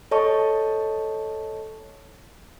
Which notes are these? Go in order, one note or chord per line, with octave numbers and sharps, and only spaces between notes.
A4 C#5 D#5 A5 C#6